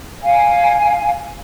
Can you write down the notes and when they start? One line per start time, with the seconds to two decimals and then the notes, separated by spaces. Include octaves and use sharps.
0.22 F5 G#5